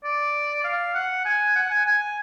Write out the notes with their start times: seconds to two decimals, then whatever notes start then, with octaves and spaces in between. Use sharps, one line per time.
0.04 D5
0.64 F5
0.95 F#5
1.25 G#5
1.55 F#5
1.70 G#5
1.86 G#5